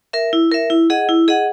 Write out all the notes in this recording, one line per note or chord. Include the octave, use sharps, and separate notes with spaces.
A#4 E5
E4
A#4 E5
E4
G#4 D#5 F#5
E4
G#4 D#5 F#5